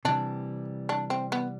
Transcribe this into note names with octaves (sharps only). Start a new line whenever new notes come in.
C3 E3 G3 D4
D4
C4
B3